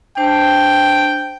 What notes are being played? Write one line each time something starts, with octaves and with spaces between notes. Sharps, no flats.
D4 C5 G5 A5